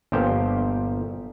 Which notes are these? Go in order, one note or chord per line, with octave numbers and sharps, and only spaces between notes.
G1 A#2 F3 G4 C5